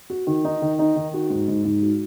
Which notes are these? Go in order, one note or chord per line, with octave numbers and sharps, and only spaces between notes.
F#4
D#3
D#4
D#3
D#4
D#3
F#4
G#2
G#2
G#2
F#4